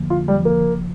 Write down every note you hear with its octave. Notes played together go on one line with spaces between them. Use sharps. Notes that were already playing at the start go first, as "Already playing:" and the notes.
Already playing: F2 D3 F3 A#3
F4
D3
G3
F3
A#3
C#3